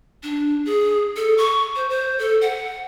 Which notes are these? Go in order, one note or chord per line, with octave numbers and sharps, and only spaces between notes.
D4
G#4
A4
C#6
C5
C5
A4
F#5